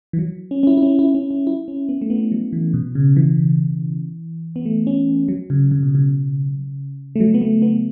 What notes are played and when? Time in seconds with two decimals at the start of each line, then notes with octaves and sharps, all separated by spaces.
0.13 E3
0.19 F#3
0.51 C#4
0.63 C#4
0.67 E4
0.77 E4
0.82 C#4
0.99 E4
1.15 C#4
1.31 C#4
1.47 E4
1.68 C#4
1.89 B3
2.01 A3
2.10 B3
2.32 F#3
2.53 E3
2.74 B2
2.95 C#3
3.16 E3
4.56 B3
4.66 A3
4.87 C#4
5.28 F#3
5.50 C#3
5.71 C#3
5.83 B2
5.95 C#3
7.16 A3
7.20 F#3
7.34 B3
7.41 A3
7.62 B3